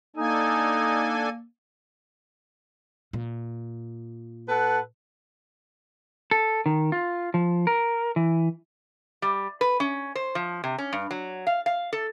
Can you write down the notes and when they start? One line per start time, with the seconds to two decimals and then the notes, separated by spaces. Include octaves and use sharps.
0.16 A#3 D4 D#4 A4 G#5
3.13 A#2
4.48 A4 B4 F#5
6.31 A4
6.66 D#3
6.92 F4
7.34 F3
7.67 A#4
8.16 E3
9.22 G3
9.61 B4
9.80 C#4
10.15 C5
10.35 F3
10.64 C3
10.78 C#4
10.93 G2
11.11 F#3
11.47 F5
11.66 F5
11.93 A4